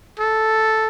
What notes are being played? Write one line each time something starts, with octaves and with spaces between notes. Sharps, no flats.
A4